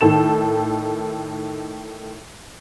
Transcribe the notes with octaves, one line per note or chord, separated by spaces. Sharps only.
A2 D#3 A4 E7